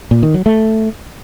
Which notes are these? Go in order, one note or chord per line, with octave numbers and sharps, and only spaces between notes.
A#2
D#3
F#3
A3